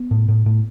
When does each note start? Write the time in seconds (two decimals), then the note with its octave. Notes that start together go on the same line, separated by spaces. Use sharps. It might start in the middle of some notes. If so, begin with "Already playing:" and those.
Already playing: B3
0.11 A2
0.28 A2
0.46 A2